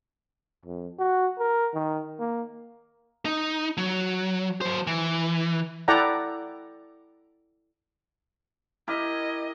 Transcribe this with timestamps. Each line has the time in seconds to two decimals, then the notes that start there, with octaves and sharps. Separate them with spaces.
0.65 F2
0.99 F#4
1.39 A#4
1.74 D#3
2.19 A#3
3.25 D#4
3.77 F#3
4.61 F#3 C5
4.87 E3
5.88 E4 A4 D5 F#5 G5 A#5
8.88 E4 G4 A#4 D#5